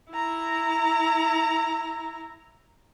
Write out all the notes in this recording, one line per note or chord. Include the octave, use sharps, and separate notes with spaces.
E4 A#5